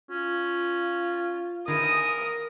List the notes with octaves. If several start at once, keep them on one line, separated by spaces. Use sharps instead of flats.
C#4 F4
D#3 E4 G#4 A#4 D#6